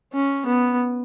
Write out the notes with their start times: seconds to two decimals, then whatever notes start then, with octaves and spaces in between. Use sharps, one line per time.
0.13 C#4
0.46 B3